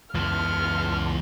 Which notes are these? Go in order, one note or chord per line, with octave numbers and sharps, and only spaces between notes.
C#2 F#2 E3 B3 A5 C6 F6